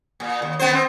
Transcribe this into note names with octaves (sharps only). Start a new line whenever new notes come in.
A#2
D#2
D#3 B3 C5
C4